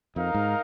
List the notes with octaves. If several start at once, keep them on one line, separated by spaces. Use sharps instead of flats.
F2 D#4 A#4 F5
G#2